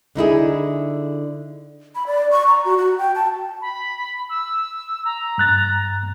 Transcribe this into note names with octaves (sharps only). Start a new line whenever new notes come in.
D3 D#4 E4 G#4
B5
D5
C#6
A#5
F#4
F#4
G5
A5
B5
E6
A#5
G2 F#6 A6